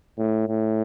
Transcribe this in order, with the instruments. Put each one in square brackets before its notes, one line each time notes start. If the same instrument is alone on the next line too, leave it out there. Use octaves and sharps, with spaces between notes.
[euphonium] A2
A2